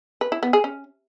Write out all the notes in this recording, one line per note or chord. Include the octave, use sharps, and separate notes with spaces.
B4
E4
B3
G#4
C#4